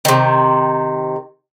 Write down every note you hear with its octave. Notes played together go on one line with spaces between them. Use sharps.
C3 D#3